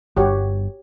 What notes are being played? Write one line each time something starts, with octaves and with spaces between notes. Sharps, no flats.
G1 G2 F#4 G4 C#5